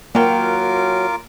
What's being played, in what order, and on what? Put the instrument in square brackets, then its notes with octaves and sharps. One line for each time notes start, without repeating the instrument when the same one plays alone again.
[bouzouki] F#3 G5 [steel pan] A#3 [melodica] F4 A#4 D6